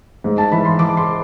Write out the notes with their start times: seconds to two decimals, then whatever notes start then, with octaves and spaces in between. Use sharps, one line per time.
0.24 G#2
0.38 A5
0.52 E3 B5
0.65 C6
0.79 E3 D6
0.97 C6